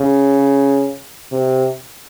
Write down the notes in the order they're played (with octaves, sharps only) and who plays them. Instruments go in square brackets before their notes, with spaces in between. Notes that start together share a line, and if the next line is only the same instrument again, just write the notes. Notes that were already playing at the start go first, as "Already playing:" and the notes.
Already playing: [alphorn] C#3
C3